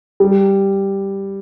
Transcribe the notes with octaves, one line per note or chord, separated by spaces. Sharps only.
G3